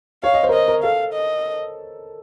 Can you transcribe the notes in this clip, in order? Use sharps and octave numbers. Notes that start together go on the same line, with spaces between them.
C#5 F5
D#5
C5
A#4
C5 D#5
A#4
A4 F5
D#5